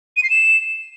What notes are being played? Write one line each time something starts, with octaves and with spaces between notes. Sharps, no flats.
D#7
C7
E7